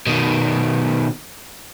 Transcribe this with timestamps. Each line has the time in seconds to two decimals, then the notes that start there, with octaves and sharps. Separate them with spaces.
0.06 B2 D#3